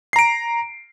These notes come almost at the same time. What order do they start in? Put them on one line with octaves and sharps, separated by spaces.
C7 A#5 D7